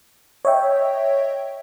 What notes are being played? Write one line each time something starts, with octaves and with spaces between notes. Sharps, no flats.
C#5 D#5 E5 G5